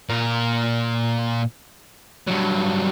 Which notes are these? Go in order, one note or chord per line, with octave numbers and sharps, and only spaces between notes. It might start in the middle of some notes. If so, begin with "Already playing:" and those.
A#2 A#4
G2 F#3